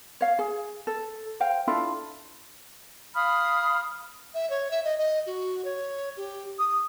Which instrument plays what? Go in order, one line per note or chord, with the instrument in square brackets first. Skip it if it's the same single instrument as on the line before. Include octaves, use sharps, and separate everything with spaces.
[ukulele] C#5 F5
G#4
A4
C5 F5 G5
D4 E4 F4 A4
[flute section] F5 B5 D#6 F6
[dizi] E5
C#5
E5
D#5
D#5
F#4
C#5
G4
D#6